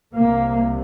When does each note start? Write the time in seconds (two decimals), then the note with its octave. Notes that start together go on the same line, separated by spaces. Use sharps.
0.15 C2 C3 A#3